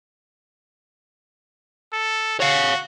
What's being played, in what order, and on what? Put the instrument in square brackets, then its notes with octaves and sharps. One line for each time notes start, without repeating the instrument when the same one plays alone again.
[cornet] A4
[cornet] F#4 [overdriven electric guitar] C#5 F5